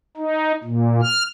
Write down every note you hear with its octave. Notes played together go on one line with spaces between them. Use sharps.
D#4
A#2
F6